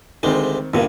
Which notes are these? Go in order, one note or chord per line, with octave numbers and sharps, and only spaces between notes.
D2 D#3 G3 G#3 C4
A#1 G2 D3 A#3